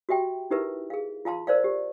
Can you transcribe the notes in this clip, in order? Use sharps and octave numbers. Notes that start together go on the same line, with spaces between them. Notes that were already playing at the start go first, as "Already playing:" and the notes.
F#4 G4 E5 G5
D#4 E4 G4 A#4 B4 E5
G#4 F5
F4 F5 A5 C6
A#4 C5 D5 F5
G4